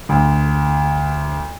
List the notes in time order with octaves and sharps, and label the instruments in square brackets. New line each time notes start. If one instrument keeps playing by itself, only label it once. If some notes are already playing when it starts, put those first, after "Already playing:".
[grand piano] D2